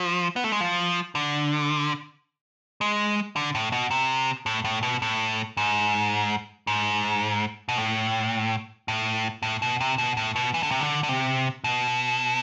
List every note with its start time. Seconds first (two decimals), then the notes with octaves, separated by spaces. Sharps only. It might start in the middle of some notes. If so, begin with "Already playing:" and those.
Already playing: F3
0.36 B3
0.44 A3
0.52 G#3
0.61 F3
1.15 D3
2.81 G#3
3.36 D3
3.55 A2
3.72 B2
3.91 C3
4.46 A2
4.65 A2
4.83 B2
5.02 A2
5.57 G#2
6.67 G#2
7.69 B2
7.78 A2
8.88 A2
9.42 A2
9.62 B2
9.80 C3
9.98 B2
10.17 A2
10.36 B2
10.54 E3
10.63 D3
10.71 C3
10.80 D3
11.03 D3
11.09 C3
11.64 B2